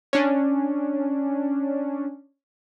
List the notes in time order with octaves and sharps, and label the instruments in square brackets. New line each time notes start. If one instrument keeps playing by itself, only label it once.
[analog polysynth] C#4 D4